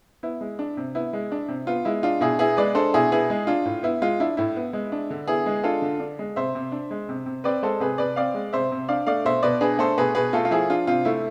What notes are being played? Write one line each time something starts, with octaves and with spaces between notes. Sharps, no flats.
B3 E4
G#3
D4
C3
B3 E4
G#3
D4
C3
B3 F4
G#3 E4
D4 F4
B2 E4 G#4
B3 E4 G#4
G#3 B4 D5
D4 A4 C5
B2 E4 G#4
B3 E4 G#4
G#3
D4 F4
A2
B3 E4
G#3 F4
D4 E4
A2 E4
B3
G#3
D4
D3
B3 E4 G#4
G#3
D4 F4 A4
D3
D4
G#3
C3 C5 E5
C3
D4
G#3
C3
C3
C4 B4 D5
G#3 A4 C5
C3 G#4 B4
C3 B4 D5
C4 D5 F5
G#3
C3 C5 E5
C3
D4 D5 F5
A3 D5 F5
B2 C5 E5
B2 B4 D5
D4 G#4 B4
A3 A4 C5
B2 G#4 B4
B2 G#4 B4
A3 F4 A4
F4
F3 E4 G#4
D4 F4
C3 F4
A3 E4